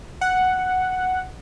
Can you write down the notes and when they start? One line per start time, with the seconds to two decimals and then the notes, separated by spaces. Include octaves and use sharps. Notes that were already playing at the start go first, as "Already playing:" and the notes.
0.21 F#5